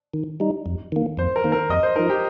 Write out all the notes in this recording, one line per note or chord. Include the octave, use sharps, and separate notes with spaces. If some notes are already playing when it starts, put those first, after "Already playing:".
D#3
G3 D#4
F2
D#3 A#3
F2 C5
A#4
D#3 A#3
A#4
F2 D#5
C5
F3 D#4 A#4
G4